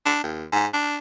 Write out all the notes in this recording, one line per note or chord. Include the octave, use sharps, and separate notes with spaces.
D4
D#2
G#2
D4